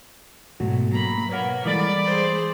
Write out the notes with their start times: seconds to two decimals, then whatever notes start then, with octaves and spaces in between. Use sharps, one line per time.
0.60 G#2 B2 F#3 A3 F#4
0.92 F#3 A#3 A#5 B5
1.29 A#3 A#4 B4 C#5 F#5
1.66 E3 G3 G#3 A4 D5 B5
2.06 G#4 C5